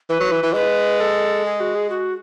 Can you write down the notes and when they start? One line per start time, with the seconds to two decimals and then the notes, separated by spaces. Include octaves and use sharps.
0.10 E3 B4
0.20 F#3
0.32 E3
0.43 E3
0.54 G#3 B4
1.00 A4
1.45 G#4
1.60 F#4
1.75 G#4
1.90 F#4